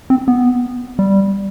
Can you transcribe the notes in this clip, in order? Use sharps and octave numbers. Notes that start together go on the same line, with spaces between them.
C4
B3
G3